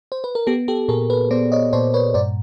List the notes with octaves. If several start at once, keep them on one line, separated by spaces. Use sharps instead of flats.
C5
B4
A#4
B3 G4 A4
G4 A4
A#2 G#4 A#4
A4 B4
B3 C5 D5
C#5 D#5
A#2 C5 D5
B4 C#5
G2 C5 D5